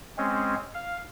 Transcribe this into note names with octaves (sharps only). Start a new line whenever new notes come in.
G#3 C4 C#4
F5